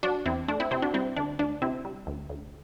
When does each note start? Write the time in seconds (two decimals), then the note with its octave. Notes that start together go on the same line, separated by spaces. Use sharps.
0.03 F#3 D4 F#4
0.26 E2 C4 E4
0.48 A3 D4
0.60 C4 E4
0.71 C3 C4 E4
0.82 D4 F#4
0.94 G3 C4 E4
1.16 D2 D4
1.39 D2 D4
1.62 C3 C4 E4
1.85 G3
2.07 D2
2.30 D2